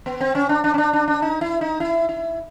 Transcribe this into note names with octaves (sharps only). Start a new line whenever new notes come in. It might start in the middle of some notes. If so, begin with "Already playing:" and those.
B3
C4
C#4
D4
D4
C#4
D4
D4
D4
D#4
E4
D#4
E4
E4